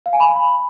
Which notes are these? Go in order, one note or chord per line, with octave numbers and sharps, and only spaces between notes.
F5
G#5
B5